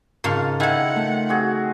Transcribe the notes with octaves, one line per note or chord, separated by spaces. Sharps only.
G#2 C#3 F4 A#4 A5 F6
D#3 E4 A4 F#5 G#5
A3
C4 F#4 G#4